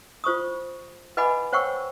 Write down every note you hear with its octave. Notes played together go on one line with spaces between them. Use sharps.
F4 C5 C#6 D#6
B4 D#5 F#5 G#5 B5 D6
C5 C#5 F#5 G5 C#6 E6